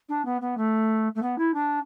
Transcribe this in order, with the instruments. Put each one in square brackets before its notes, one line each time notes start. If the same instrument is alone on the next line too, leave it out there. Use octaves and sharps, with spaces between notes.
[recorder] D4
B3
B3
A3
A3
B3
E4
D4